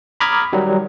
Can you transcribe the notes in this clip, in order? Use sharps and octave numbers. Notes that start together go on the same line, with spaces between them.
A#5 B5 D6 D#6 F6 G#6
D#3 F#3 G3